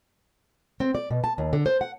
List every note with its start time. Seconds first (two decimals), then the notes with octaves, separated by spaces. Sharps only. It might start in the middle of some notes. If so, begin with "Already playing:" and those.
0.80 C4
0.95 D5
1.10 B2
1.24 A5
1.38 D#2
1.53 D3
1.66 C5
1.81 F#5